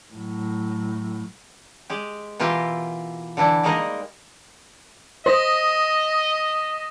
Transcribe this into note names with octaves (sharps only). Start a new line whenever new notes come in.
A2 F#3
G#3 G4
B2 E3 F4 G4 A#4 E5
D3 E3 D4 E4
G3 G#3 A#3 D#4 A#4 D#5
C5 D#5 D#6 A#6 B6